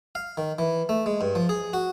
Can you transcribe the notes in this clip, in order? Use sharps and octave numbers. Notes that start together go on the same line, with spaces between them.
F5
D#3
E3
A3
G#3
G2
F3
G#4
F#4